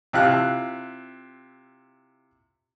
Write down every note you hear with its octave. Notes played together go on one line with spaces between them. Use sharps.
C3 E4 F4 F6 F#6